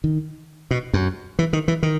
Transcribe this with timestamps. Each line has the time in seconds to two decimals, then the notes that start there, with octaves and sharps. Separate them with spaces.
0.04 D#3
0.71 B2
0.94 F#2
1.39 E3
1.53 D#3
1.68 E3
1.83 D#3